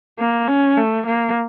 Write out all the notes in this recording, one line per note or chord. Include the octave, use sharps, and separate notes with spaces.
A#3
C#4
A3
A#3